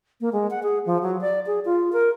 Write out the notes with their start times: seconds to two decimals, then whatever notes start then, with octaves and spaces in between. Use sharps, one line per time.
0.21 A#3
0.33 G#3
0.51 F#5
0.63 G#4
0.86 F3
1.02 F#3
1.21 D5
1.47 G#4
1.65 F4
1.93 A#4